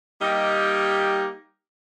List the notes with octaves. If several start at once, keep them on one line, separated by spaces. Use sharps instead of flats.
G3 A#3 D#4 G4 D#5